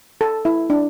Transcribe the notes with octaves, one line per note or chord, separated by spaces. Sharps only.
A4
E4
D4